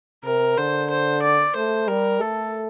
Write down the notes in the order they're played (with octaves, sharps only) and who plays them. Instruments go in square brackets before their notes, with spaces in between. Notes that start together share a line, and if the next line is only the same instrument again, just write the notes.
[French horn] C3 [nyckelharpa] A#4
[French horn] D3 [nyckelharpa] C5
[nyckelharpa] C5
D5
[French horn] A3 [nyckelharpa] C5
[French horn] G3 [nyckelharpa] A#4
[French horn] A3 [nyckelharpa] A4